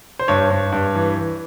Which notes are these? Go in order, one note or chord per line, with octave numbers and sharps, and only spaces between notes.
C5
G2 C#5
G2
G2
E3
E3